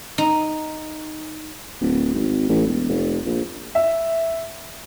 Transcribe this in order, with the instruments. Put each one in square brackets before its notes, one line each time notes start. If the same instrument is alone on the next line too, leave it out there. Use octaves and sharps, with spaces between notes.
[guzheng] D#4
[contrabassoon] D1
G#1
A1
E1
F1
A#1
[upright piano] E5